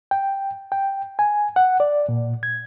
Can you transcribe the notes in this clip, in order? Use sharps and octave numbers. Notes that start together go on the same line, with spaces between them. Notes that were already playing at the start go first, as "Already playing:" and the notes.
G5
G5
G#5
F#5
D5
A#2
G#6